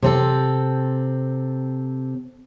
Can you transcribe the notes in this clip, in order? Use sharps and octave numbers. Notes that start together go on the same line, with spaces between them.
C3 C4 A4